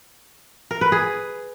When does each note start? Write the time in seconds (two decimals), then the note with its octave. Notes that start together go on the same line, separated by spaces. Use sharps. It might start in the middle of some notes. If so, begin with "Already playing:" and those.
0.71 A#4
0.81 B4
0.92 G#4